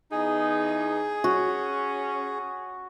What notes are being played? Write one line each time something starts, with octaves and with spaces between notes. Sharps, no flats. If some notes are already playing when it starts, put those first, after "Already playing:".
E2 D#4 G#4
C#4 F#4